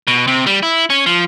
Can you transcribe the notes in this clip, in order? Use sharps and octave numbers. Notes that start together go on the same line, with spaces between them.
B2
C3 C4
G3
E4
C#4
F3